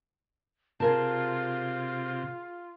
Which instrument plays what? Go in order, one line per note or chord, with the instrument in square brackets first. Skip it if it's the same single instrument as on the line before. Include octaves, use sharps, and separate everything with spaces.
[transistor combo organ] C3 [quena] F4 [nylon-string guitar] G#4 A#4 A5